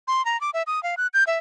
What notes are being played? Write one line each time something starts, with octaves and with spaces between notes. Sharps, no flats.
C6
A#5
D6
E5
D#6
F5
F#6
G6
E5